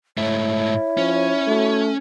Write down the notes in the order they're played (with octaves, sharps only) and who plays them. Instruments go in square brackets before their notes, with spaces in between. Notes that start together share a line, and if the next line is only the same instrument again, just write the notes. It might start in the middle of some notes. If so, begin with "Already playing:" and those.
[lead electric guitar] G#2 A3 [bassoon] E4 [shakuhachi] C#5
[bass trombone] F3 [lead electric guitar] C#4
[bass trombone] A3 [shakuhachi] F#4